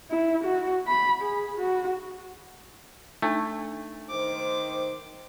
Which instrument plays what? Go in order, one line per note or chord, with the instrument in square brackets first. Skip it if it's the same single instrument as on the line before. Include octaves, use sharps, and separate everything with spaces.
[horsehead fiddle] E4
F#4
B5
G#4
F#4
[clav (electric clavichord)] A3 [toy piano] D4 D#4 A5
[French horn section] D#3 C5 [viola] D6